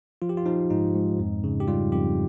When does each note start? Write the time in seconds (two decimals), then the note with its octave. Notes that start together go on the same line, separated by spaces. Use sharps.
0.22 F3 F4
0.29 G4
0.37 F4
0.46 F3 D#4
0.70 G#2 D#4
0.95 G#2
1.19 F2
1.44 C#3
1.60 G4
1.68 G3 F4
1.92 F2 G4